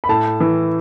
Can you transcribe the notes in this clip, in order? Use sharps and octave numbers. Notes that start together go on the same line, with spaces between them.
B5
A2 A5
E3